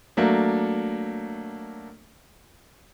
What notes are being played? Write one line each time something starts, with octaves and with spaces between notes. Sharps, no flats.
F#3 A3 A#3 D4